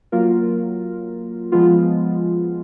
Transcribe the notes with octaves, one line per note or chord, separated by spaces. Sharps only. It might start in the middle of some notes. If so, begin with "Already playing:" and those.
F#3 A#3 F4 A#4
F3 G#3 B3 F4